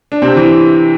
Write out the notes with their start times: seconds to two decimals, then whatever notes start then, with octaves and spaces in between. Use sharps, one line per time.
0.12 D4
0.22 C3 C4
0.36 E3